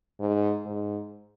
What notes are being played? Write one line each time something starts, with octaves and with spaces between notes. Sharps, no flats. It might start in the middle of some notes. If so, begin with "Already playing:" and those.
G#2
G#2